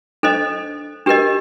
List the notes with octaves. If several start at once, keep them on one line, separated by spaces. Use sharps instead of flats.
D4 A4 C5 D#5
D4 G4 A#4 D#5